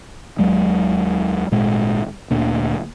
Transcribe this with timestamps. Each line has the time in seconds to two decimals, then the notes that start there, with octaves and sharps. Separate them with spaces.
0.39 D#2 F#3 G#3
1.51 G#1 A#2 G#3
2.30 D2 A#2 D3